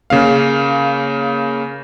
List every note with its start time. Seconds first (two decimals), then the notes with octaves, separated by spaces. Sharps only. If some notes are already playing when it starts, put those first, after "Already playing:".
0.10 C#3 A#3 F5